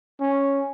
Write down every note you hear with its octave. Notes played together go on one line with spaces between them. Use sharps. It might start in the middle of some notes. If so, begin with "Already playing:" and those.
C#4